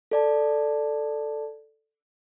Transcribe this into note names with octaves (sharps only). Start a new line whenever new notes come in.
A4 D5 A5